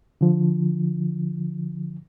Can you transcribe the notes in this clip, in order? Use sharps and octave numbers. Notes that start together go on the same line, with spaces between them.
D3 F3